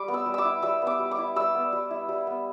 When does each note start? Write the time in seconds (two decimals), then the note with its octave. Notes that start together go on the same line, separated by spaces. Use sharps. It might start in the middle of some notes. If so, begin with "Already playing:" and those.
Already playing: G3 D6
0.08 B3
0.14 E6
0.26 G3
0.34 D6 E6
0.45 E4
0.62 G3 E6
0.82 B3 D6
1.00 G3
1.11 D6
1.18 E4
1.36 G3 E6
1.55 B3
1.73 G3
1.91 E4
2.09 G3
2.27 B3